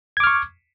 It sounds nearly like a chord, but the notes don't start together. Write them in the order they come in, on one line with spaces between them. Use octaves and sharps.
G#6 D6 F6 C#6